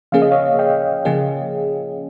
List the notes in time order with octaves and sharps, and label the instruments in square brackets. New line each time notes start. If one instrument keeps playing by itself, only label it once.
[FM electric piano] C#3 F3 A#3 C#4 G#4 [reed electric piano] F5
[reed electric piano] D#5
C#5 F5
D#5 G5
[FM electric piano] C#3 F3 A#3 C#4 G#4